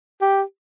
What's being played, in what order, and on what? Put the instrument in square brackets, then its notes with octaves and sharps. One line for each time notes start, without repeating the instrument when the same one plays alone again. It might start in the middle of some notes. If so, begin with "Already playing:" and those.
[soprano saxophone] G4